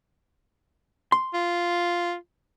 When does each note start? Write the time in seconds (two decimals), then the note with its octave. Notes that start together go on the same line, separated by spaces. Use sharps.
1.12 C6
1.34 F4